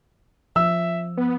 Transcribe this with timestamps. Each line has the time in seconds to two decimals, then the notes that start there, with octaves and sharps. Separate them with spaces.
0.56 F3 E5 E6
1.17 B3